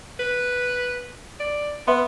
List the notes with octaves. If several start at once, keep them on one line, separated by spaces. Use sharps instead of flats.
B4
D5
B3 B4 E5 C6